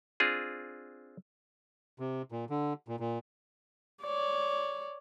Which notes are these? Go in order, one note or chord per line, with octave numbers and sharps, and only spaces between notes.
C4 D4 F4 G#4
C3
A#2
D3
A#2
A#2
C#5 D5